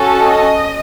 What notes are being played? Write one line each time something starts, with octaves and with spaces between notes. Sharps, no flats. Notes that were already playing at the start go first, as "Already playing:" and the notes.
Already playing: C#4 F#4 A4
D#5